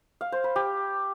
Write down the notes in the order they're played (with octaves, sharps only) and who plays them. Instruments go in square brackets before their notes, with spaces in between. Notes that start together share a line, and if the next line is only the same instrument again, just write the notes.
[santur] F5
C5
B5
G4